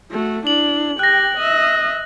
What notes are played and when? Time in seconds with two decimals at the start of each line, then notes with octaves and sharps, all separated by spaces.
0.11 A3 F#4
0.47 D4 E4 F#7
0.99 G4 G5 F#6 A#6
1.38 D#5 E5